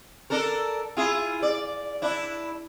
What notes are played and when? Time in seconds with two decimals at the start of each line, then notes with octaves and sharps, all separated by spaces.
0.30 D4 A4 A#4
0.97 E4 F4 G#4
1.42 D5
2.02 D4 E4